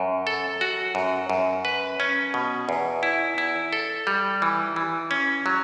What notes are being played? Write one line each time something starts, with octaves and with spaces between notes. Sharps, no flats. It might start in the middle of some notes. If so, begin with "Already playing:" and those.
Already playing: F#2
A4
F#4
F#2
F#2
B4
C#4
B2
E2
E4
E4
A4
G3
E3
E3
C#4
F#3